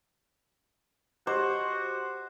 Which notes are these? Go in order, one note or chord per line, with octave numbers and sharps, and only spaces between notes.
F#4 G4 C5 D#5 D6